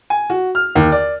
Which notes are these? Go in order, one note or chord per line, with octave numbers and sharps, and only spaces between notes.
G#5
F#4
F6
D#2
D5